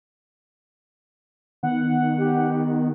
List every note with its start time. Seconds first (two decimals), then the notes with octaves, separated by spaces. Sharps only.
1.63 D#3 B3 F#5
2.19 G4